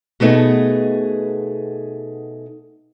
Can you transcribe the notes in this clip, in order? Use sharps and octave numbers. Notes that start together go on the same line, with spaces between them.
B2 A3 B3 D#4 G#4